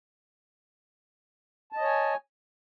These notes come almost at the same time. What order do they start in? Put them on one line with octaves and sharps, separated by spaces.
A5 D#5 C#5 G#5